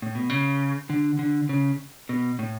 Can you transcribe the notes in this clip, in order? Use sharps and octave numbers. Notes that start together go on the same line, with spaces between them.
A2
B2
C#3
D3
D3
C#3
B2
A2